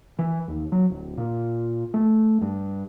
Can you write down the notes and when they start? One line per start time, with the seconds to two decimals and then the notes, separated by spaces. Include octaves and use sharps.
0.19 E3
0.48 D#2
0.72 F#3
0.90 D1
1.17 A#2
1.94 A3
2.42 G2